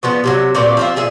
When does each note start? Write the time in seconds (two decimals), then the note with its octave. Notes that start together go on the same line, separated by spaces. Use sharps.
0.03 C#3 F3 B3 D#5
0.24 C3 D#3 F#3
0.55 A#2 A3 C4 B4
0.77 F3 C4 E5
0.96 A#2 G#4 E5